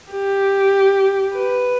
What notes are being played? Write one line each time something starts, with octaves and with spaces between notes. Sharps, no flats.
G4
B4